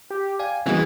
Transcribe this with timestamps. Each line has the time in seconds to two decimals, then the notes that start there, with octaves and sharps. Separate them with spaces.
0.10 G4
0.39 D5 F5 G5 G#5
0.66 C#3 E3 G3 G#3 A#3 B3 F#4